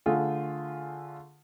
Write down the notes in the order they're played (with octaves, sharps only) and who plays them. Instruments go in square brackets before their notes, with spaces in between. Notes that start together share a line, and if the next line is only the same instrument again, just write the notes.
[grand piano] D3 A3 F4 G#4